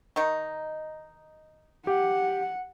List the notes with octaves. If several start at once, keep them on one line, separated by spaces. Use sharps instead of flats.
D#3 D#4
G4 F#5